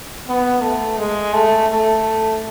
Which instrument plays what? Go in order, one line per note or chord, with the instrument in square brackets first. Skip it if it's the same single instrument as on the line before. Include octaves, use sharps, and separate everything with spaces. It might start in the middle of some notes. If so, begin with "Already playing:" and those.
[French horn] B3
A3
G#3
A3
A3